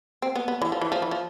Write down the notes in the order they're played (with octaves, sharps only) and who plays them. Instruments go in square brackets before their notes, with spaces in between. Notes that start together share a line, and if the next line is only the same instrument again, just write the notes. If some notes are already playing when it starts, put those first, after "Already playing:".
[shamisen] C4
B3
B3
E3
F3
E3
F3
E3
F3